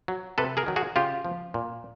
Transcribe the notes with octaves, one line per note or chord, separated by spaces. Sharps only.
F#3
C3 A4 B4
G#4 A#4
D#3 F#3
F#4 G#4
C#3 F4 G4
F3
A#2